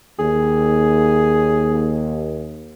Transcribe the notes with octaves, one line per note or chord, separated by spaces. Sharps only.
D#2 G#4